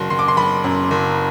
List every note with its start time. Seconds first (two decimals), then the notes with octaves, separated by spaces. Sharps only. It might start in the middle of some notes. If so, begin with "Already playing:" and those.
Already playing: F#1 F#3 C6
0.10 F#1 C6
0.19 D6
0.28 C6
0.37 F#1 B5
0.64 F#2
0.91 F#1